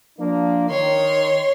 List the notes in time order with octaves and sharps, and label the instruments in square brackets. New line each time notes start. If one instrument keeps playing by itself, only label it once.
[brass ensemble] F3 A#3 D4
[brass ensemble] D#3 [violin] C#5 C6